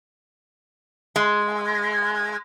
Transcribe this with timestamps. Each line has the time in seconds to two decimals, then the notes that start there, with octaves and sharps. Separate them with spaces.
1.16 G#3